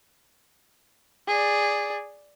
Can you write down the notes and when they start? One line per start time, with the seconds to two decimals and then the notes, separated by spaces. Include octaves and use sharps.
1.28 G#4 D5